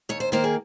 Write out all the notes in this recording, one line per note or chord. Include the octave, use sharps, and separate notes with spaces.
D#2 C#5
C5
D#3 A#3 C5
G#4